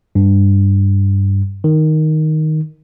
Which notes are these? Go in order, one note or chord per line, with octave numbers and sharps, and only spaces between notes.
G2
D#3